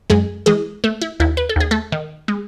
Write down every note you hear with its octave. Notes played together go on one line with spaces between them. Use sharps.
F#2 G#3 G#4
E3 G#3 G#4
A3
E4
D#2 E4
B4
A4
D#2 G#4
A3 A4
D#3
G#3